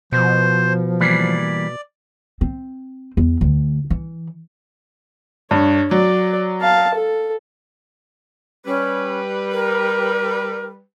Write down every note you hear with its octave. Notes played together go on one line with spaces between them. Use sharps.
B2 F3 C5
E3 G3 A#3 D5
C4
E2
D2
E3
G2 C#5
F#3 D5
F5 A5
A4
G3 C#4 B4
A#4